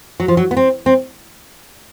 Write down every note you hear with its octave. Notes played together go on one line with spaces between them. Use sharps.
F#3
F3
F#3
B3
C4
C4